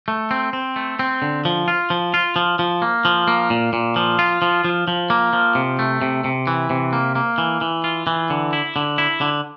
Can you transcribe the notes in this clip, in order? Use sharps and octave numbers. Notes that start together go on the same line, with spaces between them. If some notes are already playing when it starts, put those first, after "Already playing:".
A3
C4
C4
A3
C4
D3
F3
F4
F3
F4
F3
F3
A#3
F3
A#3
A#2
A#2
F3
F4
F3
F3
F3
A#3
F3
C3
A3
C3
C3
E3
C3
A#3
A#3
E3
E3
F4
E3
D3
E4
D3
E4
D3